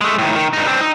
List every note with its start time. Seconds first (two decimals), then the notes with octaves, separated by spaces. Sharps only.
0.01 G#3 A3
0.19 A2 D#3
0.35 D#3
0.53 G2 D#4
0.67 C4 D4
0.81 D#4